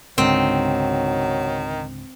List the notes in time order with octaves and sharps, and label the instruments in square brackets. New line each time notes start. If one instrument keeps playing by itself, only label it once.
[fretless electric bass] C#2 G#2 D3 [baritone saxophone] D#3 [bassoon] F#3 [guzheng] C4